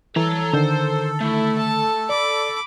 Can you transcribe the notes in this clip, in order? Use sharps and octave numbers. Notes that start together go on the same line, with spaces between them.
E3 A4 C#5 A#5
D3 D#3 A#4 C5
A3 E4
A5
D5 B5 D6